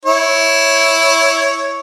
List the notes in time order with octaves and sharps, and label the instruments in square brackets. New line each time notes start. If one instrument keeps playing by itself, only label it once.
[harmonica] E4 C#5